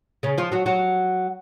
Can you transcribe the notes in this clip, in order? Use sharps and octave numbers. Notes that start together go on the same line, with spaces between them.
C#3 C#4
F3 F4
F#3 F#4
F#3 F#4